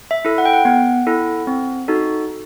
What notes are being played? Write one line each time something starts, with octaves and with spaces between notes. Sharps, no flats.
E5
E4 A4
F#5
G5
F#5
B3 F#5
E4 A4
C4
D#4 F#4 A4